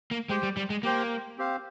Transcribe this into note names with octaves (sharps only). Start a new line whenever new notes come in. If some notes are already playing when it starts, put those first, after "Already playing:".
A#3
G#3 G4 C5 G5
G3
G3
G#3
A#3 G4 C5 G5
C4 G4 C5 F5